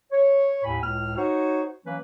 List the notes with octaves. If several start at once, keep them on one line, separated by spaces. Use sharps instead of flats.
C#5
D#2 A2 G#5 B5
C#2 A2 F6
D#4 F#4 C5 C#5
E3 F#3 A#3 C#4 B4